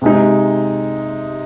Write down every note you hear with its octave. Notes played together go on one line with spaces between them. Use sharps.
C3 G#3 D#4